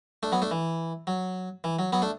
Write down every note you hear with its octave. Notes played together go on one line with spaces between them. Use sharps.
A3 D4
F#3 B3
A3 D4
E3
F#3
E3
F#3
F#3 B3
A3 D4